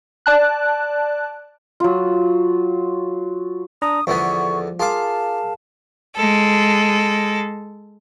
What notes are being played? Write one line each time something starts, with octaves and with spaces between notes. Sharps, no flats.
D5 A5 F#6
F#3 F4
D4 A#5 D#6
E2 D3 F3 B3 C#6
F4 G#4 A#4 F5 A5 D6
G#3 A4